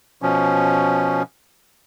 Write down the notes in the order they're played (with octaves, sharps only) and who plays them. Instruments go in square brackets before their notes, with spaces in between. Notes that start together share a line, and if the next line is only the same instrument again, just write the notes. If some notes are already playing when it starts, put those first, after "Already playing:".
[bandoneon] B2 F3 C#4